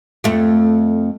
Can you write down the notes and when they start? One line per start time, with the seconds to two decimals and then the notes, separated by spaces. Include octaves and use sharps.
0.24 F2 A3